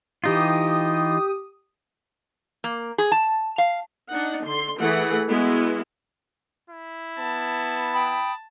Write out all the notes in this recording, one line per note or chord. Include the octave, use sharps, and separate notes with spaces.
E3 D#4 F4 G4 D#6
A#3
G#4
A5
F5
D4 D#4 F#5
D3 C6
E3 A3 G#4 F#5
G#3 B3 E4 F#4
E4
B3 A5
G5 B5 D#6